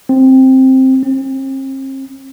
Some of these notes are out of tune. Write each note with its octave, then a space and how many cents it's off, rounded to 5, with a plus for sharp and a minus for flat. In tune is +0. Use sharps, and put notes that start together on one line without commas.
C4 +5
C4 +40